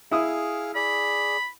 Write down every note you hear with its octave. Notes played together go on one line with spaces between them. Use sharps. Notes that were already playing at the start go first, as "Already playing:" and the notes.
E4 G#4 F5 D#6
G#4 D5 B5